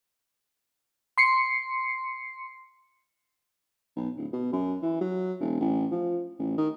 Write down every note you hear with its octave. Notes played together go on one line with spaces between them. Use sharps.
C6 C7 C#7
B1
D1
B2
F#2
E3
F#3
E1
A1
F3
A1
D#3